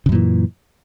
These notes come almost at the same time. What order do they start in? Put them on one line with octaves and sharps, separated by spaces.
C#3 F#2 A#2 E3